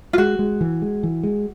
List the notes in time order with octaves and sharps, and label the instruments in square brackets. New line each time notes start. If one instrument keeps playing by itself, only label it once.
[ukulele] F4
[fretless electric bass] G#3 [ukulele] F#4
[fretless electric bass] G#3
E3
G#3
E3
G#3